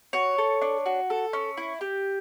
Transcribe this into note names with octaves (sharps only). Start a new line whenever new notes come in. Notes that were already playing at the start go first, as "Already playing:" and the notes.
F#4 C#5
A4
D4
F#4
A4
C#4
E4
G4